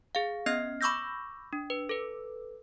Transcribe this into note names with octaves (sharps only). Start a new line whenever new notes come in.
G#4 F5
B3 C#4 D#5 F6 C7
B5 C#6 D6 E6 G6 A#6
D4
B4
A4 B4